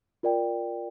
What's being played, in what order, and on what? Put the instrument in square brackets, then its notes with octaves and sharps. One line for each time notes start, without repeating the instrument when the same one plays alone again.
[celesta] F4 A#4 D5 G5